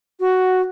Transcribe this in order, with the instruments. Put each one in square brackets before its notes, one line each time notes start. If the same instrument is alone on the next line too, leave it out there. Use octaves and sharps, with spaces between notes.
[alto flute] F#4